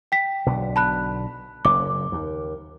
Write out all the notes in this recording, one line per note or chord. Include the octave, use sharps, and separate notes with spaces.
G5 B6
B1 B2 D3
A5 B5 F#6
F#1 F#2 D6
D#2